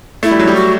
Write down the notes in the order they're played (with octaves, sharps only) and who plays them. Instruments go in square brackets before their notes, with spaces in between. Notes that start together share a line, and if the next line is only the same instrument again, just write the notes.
[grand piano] A3 [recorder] E4
[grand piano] G3
F#3
G3
[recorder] F#4